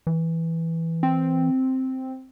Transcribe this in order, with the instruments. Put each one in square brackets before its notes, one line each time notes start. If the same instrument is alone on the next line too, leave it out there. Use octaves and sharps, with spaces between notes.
[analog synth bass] E3
[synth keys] C4